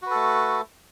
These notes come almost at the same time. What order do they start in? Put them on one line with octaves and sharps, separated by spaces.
F#4 B4 A4 A3